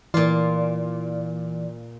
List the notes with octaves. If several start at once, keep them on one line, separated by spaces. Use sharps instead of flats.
A#2 E3 F4 D5